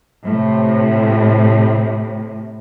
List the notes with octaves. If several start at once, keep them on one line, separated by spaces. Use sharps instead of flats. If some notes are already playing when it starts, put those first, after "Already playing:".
A2 C3